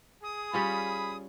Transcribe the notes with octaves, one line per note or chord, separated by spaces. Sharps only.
G#4 D#6
G3 C#4 F4 B5